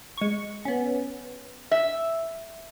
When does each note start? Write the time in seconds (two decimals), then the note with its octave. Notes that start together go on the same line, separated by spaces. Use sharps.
0.17 G#3 C#6
0.65 B3 C#4
1.71 E5